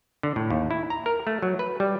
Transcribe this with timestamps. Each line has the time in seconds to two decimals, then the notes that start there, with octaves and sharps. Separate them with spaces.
0.23 D3
0.36 A2
0.50 D#2
0.71 E4
0.90 A#5
1.06 A#4
1.27 A3
1.43 F#3
1.59 B4
1.80 G3